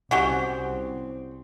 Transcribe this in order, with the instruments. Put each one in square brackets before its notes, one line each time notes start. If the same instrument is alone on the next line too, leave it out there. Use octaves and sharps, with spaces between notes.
[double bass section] C2 C4 [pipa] C#4 F#4 G4 [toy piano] F#5